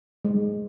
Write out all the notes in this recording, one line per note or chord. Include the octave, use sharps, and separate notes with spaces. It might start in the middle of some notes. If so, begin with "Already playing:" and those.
G#3